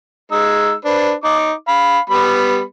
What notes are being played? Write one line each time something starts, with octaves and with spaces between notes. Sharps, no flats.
G#3 D#4 E6
D4 B4 C5
D#4 D6
F5 B5
G3 B3 B5